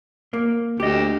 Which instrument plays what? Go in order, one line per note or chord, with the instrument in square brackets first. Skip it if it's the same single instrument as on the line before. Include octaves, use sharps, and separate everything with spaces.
[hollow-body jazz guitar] A#3
[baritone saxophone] D2 [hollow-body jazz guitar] G4 D#5